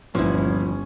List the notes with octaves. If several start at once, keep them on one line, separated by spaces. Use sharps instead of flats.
G1 D2 A#2 E3 F3 C#4 E4